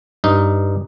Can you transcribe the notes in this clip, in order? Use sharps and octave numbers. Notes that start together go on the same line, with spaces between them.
G2 D#4